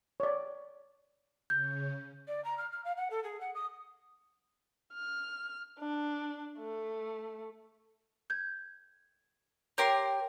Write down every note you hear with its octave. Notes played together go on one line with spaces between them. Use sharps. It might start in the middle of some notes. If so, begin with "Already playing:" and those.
C#5 D5
C#3 C#4 G6
D5
A#5
F6
F6
F5
F#5
A4
G#4
F#5
D#6
F6
D4
A3
G6 G#6
G4 A#4 C#5 G5 C6